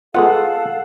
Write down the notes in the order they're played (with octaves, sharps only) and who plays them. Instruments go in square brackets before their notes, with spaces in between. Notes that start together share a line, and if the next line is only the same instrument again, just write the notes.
[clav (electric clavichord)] G#3 B3 F4 [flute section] A4 F5 [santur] F#5